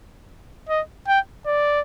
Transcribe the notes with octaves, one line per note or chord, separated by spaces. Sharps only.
D#5
G5
D5